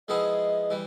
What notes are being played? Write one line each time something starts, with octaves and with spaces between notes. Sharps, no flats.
F3 G#3 B3 E4 G#4 D#5
E3 G3